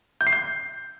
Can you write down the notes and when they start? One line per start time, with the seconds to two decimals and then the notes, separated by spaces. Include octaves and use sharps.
0.21 G6
0.27 C7
0.33 G6